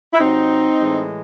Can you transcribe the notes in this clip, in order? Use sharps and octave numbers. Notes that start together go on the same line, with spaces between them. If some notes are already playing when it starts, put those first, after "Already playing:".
E4
C3 F#3 C4 D#4
A2 E3 G#3